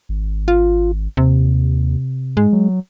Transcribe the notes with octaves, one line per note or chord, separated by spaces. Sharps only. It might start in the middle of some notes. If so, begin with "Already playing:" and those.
G#1
F4
D#2 C3
G#2 G#3
F#3